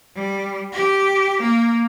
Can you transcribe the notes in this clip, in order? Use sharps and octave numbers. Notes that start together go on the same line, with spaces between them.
G3
G4
A#3